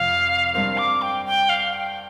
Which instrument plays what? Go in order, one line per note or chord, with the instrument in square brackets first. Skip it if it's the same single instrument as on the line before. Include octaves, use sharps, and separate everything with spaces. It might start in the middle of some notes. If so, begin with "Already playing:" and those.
Already playing: [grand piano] F1 F2 C3 [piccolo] F5
[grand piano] G2 G3 C4 A#4 [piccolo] F5
[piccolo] D6
G5
G5
F5
G5